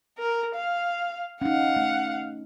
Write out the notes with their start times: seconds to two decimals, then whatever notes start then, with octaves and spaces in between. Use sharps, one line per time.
0.18 A#4
0.55 F5
1.42 C#4 D#4 F5 F#5
1.76 A3